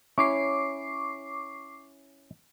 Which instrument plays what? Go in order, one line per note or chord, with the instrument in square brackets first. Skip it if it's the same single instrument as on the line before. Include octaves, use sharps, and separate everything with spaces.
[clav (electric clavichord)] C#4 E4 C#5 [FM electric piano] C#6 D6 C7